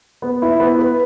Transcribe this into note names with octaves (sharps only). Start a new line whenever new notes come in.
B3
E4
B3
B4